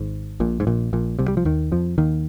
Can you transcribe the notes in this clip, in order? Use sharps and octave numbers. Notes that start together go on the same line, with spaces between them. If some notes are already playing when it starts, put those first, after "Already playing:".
Already playing: G#1 G#2
A#1 A#2
G#2
A#1 A#2
A#1 A#2
C2 C3
G3
F3
D#2 D#3
F2 F3
D#2 D#3